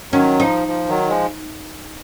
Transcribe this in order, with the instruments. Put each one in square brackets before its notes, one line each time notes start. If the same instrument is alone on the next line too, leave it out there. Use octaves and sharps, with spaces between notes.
[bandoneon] D#3 F#3 [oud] C#4
[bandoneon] F3 [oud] D#4
[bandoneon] F3
D#3 F#3
F3 G#3